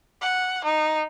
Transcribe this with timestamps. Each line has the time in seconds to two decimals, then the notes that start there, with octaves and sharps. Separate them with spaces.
0.22 F#5
0.65 D#4